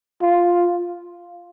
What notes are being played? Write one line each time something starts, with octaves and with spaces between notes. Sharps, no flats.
F4